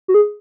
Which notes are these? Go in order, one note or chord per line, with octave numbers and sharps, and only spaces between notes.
F#4
G#4